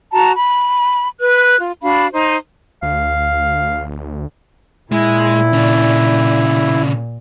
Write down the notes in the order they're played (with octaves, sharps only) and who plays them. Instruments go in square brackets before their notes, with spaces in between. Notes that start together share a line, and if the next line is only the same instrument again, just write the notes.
[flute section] F#4 A5 A#5
B5
B4 F#6
F4
D4 F#4 F5 B5
D#4 C5
[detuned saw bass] D2 [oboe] F5
[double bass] A#2 [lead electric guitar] G#3 [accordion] E4
[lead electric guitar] C#3 D4